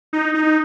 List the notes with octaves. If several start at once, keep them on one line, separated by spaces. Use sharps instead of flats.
D#4
D#4